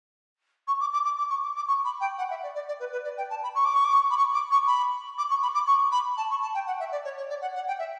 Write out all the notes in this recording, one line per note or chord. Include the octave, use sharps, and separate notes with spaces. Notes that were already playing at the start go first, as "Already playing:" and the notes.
C#6
D6
D6
D6
D6
C#6
D6
D6
C#6
B5
G5
F#5
E5
D5
D5
D5
B4
B4
D5
G5
A5
B5
C#6
D6
C#6
D6
C#6
B5
C#6
D6
C#6
B5
D6
C#6
B5
D6
C#6
B5
A5
C#6
A5
G5
F#5
E5
D5
C#5
C#5
D5
F#5
F#5
G5
E5